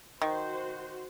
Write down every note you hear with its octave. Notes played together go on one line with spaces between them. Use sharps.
D#3 F#4 C5